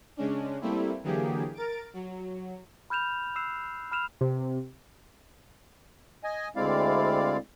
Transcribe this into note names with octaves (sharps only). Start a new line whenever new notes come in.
C#3 G#3 C#4 D4
G3 A3 A#3 C4 E4
D3 E3 F#3 A#3 G4 G#4
A#4 A6 D7
F#3
B5 F6 G6 E7 F7
E6 F#6 C7 E7
B5 F6 E7 F7
C3
D#5 G#5
D2 G#3 C4 E4 D5 F5